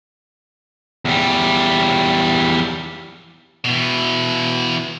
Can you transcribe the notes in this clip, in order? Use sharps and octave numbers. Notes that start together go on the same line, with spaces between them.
E2 G3
B2 E3